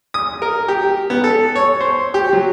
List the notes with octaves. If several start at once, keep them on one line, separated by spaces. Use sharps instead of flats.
D#6
A#4
G4
B3
A4
C#5
C5
G4
F#3